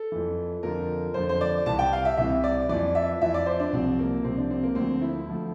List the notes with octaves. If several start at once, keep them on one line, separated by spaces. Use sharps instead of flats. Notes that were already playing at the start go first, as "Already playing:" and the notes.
Already playing: A4
F2 E3
F2 D3 F3 A#4
F2 D3 F3 C5
C5
D5
C2 C3 E3 A5
G5
F5
E5
C2 C3 E3 E5
D5
F2 E3 D5
E5
F2 E3 E5
D5
C5
D4
C2 C3 F3 C4
A#3
C2 C3 F3 C4
D4
C4
A#3
D2 D3 F3 C4
E4
D2 D3 F3